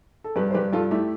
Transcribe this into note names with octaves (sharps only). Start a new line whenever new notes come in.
A4
G2 G4 B4
C5
G2 G4 B4
G2 F4 A4
A3 E4 G4